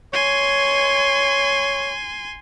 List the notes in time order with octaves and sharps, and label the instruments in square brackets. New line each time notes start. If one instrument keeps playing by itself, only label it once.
[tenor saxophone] C#5 [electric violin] G#5 C6